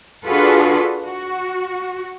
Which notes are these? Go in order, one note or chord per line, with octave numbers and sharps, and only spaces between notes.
D4 F4 F#4 G#4 A4 B4
F#4